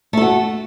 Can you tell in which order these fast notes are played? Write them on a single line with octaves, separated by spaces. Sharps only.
A3 A4 F#4